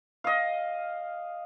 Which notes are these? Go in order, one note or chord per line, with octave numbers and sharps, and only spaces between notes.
D#5 F5